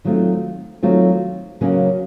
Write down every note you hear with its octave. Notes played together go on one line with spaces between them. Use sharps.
D#3 F#3 A3 C4 F4
D#3 F#3 A3 C4 F4
C#3 F#3 A#3 C#4 F#4